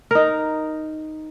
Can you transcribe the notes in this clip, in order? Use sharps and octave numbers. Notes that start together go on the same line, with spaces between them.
D#4 A#4